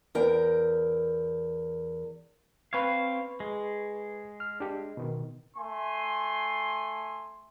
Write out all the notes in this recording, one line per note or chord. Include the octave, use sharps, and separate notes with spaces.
E2 A#4 G5
C4 B4 F5 C#6 G#6
G#3
F6
D4 G4
B2 D#3
A3 G#5 C6